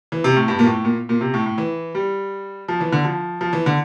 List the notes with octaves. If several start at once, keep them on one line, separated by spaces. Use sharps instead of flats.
E3
C3
A2
G2
A#2
A2
A#2
A#2
C3
A2
A2
E3
G3
F3
E3
D3
F3
F3
E3
D3